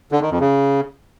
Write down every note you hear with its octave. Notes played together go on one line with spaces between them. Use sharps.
D3
D#3
F2
C#3